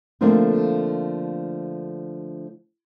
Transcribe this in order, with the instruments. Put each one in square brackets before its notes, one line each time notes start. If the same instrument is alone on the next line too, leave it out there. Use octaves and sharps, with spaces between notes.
[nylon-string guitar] D3 F3 A3 A#3 C4 D4